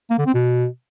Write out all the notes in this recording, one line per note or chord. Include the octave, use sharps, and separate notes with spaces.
A#3
D3
C4
B2